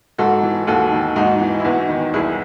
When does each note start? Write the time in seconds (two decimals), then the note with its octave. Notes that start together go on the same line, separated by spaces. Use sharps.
0.18 G#2 F#4 A4
0.43 E3
0.67 D#2 F#4 A4
0.92 D#3
1.16 G#2 D#4 F#4
1.41 E3
1.60 E4
1.64 E2 D#4 F#4
1.89 D#3
2.13 C2 E4 G#4